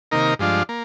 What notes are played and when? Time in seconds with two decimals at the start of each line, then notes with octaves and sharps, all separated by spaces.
0.12 C3 D#3 A#3 D#4 A#4
0.39 G2 F3 G#3 D4 F4
0.69 A#3